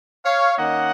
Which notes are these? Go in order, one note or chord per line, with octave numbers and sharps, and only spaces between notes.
C#5 F5
D#3 A#3 C#4 D#5 F#5